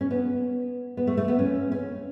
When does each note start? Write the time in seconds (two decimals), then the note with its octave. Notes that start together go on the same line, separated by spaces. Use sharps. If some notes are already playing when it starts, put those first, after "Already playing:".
0.01 C#4
0.11 B3
0.97 B3
1.07 A3
1.17 A3
1.28 B3
1.39 C#4
1.72 C#4